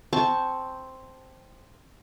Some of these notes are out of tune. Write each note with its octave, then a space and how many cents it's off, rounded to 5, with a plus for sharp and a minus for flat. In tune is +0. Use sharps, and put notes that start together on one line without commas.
C4 +0 A5 -10 C#6 +0